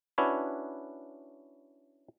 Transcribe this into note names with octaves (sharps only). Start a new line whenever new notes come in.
C#4 D4 E4 F#4 B4 C#5